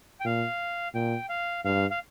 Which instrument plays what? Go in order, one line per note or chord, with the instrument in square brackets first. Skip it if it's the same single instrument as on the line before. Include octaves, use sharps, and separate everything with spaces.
[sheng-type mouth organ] G5
[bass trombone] A#2 [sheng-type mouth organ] F5
[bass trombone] A#2 [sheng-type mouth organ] G5
[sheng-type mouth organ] F5
[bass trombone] G2 [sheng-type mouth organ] F5
[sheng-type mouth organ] F5